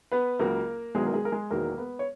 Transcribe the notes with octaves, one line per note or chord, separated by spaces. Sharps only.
B3 B4
C#2 C#3 F#3 A#3 A#4
E1 E2 D#3 F#3 G#3 G#4
A#4
G#3 G#4
A#4
G#3 G#4
E1 E2 D#3 F#3 A#3 A#4
B3 B4
C#5